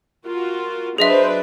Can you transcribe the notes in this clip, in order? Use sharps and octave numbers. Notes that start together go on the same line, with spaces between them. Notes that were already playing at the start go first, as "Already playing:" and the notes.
F4 F#4 A#4
F#3 D4 G#4 B4 C5 D#5 E5